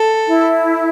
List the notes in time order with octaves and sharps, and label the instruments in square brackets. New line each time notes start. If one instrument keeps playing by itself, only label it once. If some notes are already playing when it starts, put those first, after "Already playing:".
Already playing: [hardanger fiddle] A4
[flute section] E4